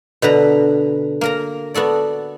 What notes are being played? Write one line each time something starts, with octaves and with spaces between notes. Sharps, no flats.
B2 D3 B4 A#5
A#3 A#4 A#5
B3 F#4 A4 D5